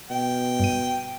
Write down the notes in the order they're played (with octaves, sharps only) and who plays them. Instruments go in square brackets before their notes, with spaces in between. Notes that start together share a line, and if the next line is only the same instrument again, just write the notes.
[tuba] B2 [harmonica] G5
[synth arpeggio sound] G2 D#7